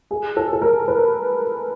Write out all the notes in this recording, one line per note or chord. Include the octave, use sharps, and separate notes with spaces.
G#4
A4
A4
A#4
B4